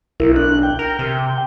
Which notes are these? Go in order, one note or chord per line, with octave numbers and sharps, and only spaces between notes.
B1 E4 A#4
D4 F#6
G5
A#4
C3